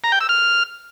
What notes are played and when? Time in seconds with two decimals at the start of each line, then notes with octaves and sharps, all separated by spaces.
0.04 A#5
0.12 G5
0.21 E6
0.29 F6